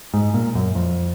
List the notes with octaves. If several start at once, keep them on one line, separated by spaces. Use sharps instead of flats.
G#2
A#2
F#2
F2